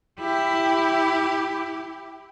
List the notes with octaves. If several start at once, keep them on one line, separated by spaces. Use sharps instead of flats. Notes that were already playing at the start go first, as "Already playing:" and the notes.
E4 G4